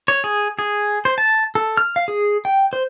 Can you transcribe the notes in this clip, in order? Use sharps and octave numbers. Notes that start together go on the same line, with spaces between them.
C#5
G#4
G#4
C5
A5
A4
F6
F5
G#4
G5
C5